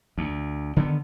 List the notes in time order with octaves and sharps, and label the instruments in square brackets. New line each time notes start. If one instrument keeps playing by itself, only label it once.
[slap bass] D2
D3 D#3 B3